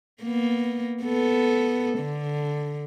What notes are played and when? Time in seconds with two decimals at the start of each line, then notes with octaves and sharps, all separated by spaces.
0.23 A#3 B3
1.04 B3 A4
1.99 D3